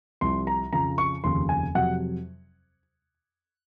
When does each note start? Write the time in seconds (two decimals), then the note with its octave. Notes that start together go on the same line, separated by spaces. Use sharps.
0.21 C2 C3 F3 C6
0.47 A#5
0.73 F2 C#3 F3 A#5
0.98 C#6
1.24 F1 D#2 C#3 F3 C6
1.49 G#5
1.75 F2 C3 F#3 F#5